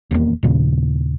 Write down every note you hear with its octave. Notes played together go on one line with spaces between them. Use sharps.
D#1 E2 F3 A#3
D#2 A#2 C#3